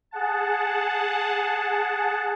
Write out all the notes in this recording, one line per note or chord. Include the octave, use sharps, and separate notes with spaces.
G#4 F#5 A5